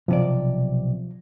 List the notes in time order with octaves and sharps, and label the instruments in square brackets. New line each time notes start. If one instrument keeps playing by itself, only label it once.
[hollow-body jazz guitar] B1 C3 D5 [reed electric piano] F3